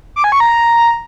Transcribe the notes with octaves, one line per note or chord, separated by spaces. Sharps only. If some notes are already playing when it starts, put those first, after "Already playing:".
D6
G#5
C#6
A#5